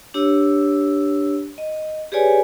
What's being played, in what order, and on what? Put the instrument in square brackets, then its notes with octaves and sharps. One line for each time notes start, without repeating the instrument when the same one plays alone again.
[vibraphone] D4 G4 C#5 E6
D#5
G4 G#4 B4 C#5 D5 G#5